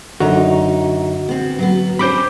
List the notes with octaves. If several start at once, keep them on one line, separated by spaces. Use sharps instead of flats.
F#2 D3 D#4 F#4 A#5
B3 C4
F#3 B3
C4 C#4 C5 B5 D6 G6